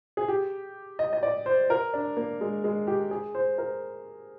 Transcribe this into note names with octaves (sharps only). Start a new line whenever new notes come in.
G#4
G4
D#5
D#5
D5
C5
A#4
D4
A#3
G#3
G#3
G4
G#4
C5
A#4